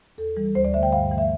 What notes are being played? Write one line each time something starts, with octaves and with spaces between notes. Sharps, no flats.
E2 A4
E3 G3
D2 C5
D5
D3 A3 E5
G5
G2 F5
E3 A3
E5